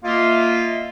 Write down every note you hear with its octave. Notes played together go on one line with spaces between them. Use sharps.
A#3 F4 D#5 E5